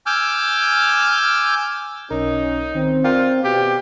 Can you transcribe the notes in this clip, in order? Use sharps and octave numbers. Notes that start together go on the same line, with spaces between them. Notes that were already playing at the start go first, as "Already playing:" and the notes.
G#5 D6 E6 F6 G6
B1 C#4 D#4 A#4
D#3 C4
F4 A#4 D5 G5
B2 G4